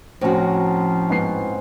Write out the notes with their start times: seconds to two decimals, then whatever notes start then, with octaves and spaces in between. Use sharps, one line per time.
0.21 A2 F3 C4 C#4 F#4 A#5
1.10 G#2 B3 C7